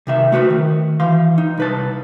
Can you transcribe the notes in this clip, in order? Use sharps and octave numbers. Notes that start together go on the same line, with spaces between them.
C3 D#3 E5
A3 F#4 B4 C5
D#3
E3 F5 C6
D#4
C2 B4 A5